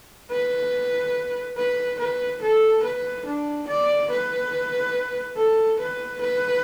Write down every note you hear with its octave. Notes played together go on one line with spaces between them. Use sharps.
B4
B4
B4
A4
B4
D4
D5
B4
A4
B4
B4